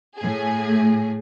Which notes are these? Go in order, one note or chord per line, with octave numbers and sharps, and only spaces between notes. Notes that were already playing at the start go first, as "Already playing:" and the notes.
A2 G#4